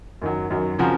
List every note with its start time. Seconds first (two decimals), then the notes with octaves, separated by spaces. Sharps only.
0.22 F#2 D#3 F#3
0.50 F#2 D#3 F#3
0.79 C#3 F3 C4 F#4 A#4